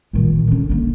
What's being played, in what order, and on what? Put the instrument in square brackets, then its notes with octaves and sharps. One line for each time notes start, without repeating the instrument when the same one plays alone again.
[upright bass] A#2 D#3
D3 C#4
D3 A#3